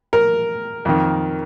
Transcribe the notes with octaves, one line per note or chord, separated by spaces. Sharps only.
A#4
F2 D#3